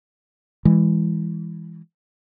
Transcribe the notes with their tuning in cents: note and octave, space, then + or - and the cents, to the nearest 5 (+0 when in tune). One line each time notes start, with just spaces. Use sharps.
E3 +0 G#3 -20